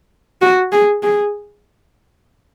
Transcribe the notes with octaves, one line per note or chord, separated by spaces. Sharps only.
F#4
G#4
G#4